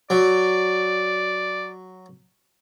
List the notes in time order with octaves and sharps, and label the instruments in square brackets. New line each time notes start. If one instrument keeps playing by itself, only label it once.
[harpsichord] F#3 [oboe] D5